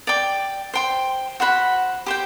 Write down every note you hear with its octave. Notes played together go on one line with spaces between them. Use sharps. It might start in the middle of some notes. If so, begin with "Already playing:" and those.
D5 G5 D6
C5 G5 C6
F#4 C5 F#5 B5
G4 C5 G5